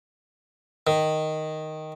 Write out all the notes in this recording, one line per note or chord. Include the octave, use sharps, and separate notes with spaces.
D#3